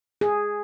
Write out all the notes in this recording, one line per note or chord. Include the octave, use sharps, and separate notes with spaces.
G#4